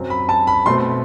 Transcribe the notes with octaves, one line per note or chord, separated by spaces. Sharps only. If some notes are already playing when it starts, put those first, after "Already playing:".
Already playing: F#2 F#3 C4
B5
A5
B5
B2 A3 C4 C6